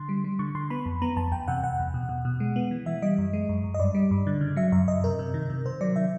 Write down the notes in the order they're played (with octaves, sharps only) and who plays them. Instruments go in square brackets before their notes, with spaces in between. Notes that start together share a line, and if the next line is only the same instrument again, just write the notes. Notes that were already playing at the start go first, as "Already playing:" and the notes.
Already playing: [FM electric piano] D3 C6
G3
G3
D3 C#6
D3 C6
B3 B5
F2
B3 A#5
F2 A5
E2 G5
C3 F#5
E2 F#5
E2
B2
B2
B2
G#3
B3
E3
E3 E5
G3 D#5
F#2
G#3
F#2
F#2
D#5
G2 D5
G3
G2
D3
C#3
F#3 E5
F#2 E5
F#2 D#5
C3 A#4
C3
D#3
C3
C3 C5
F#3 D5
D#3 E5